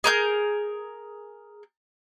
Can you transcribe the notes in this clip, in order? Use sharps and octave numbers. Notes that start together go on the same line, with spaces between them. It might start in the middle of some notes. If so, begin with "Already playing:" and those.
G#4 A#4 G6